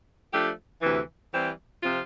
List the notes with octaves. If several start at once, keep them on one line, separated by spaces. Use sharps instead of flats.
F3 A3 D4 G4
D2 C3 E3
E3 G3 C4 G4 C5
C3 F3 C4 F4